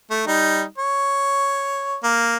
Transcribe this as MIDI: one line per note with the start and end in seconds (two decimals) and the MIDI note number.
0.10 0.26 57
0.27 0.63 55
0.27 0.63 63
0.78 1.97 73
2.04 2.37 58